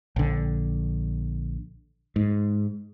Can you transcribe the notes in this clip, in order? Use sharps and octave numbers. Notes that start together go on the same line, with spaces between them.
A#1 D3
G#2